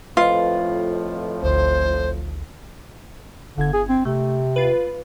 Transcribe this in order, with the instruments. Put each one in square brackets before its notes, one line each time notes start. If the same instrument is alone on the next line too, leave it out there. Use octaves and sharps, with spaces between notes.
[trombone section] F2 A2 F3 [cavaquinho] F4 [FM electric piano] B4 D#5
[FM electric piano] G#1 D2 [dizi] C5
[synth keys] G1 G#6 [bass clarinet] D3
[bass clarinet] G#4
C4
[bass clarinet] C3 [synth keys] A3
[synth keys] F4 B4